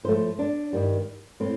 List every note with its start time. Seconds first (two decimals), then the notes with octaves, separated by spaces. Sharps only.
0.03 A2 F3 A3 C5
0.39 D4
0.73 G2 D#3 G3
1.40 A2 C4